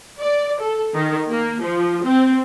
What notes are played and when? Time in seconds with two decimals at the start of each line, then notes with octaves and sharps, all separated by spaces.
0.20 D5
0.60 A4
0.95 D#3
1.29 A#3
1.62 F3
2.04 C4